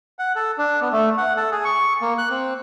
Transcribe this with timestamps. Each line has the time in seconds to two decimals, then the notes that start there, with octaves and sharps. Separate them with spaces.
0.19 F#5
0.36 A4
0.58 D4
0.81 B3
0.93 A3
1.17 F#5
1.37 A4
1.52 G#4
1.65 C#6
2.01 A#3
2.18 F#6
2.30 C4